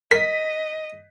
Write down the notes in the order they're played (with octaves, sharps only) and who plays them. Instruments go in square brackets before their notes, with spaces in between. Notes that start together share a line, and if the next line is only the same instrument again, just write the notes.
[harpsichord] A#4 [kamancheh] D#5 [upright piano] B6